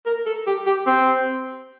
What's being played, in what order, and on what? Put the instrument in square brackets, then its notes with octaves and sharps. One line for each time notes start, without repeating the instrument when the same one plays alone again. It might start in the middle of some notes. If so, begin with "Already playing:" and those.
[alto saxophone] A#4
A4
G4
G4
C4